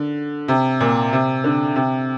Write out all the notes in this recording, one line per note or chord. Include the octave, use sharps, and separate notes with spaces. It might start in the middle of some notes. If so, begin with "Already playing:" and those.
Already playing: D3
C3
A#2
C3
D3
C3